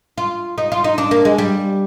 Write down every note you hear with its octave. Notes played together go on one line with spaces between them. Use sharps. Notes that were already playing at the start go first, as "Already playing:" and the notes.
F4
D#4
F4
D#4
D4
A#3
G#3
G3